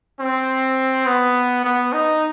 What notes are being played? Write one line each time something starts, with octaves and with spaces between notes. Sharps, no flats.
C4
B3
B3
D#4